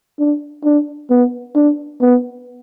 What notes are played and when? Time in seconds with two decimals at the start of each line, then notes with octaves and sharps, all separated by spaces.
0.19 D4
0.64 D4
1.10 B3
1.55 D4
2.01 B3